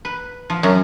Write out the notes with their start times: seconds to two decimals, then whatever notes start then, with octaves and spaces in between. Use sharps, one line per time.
0.05 B4
0.50 F3
0.63 F#2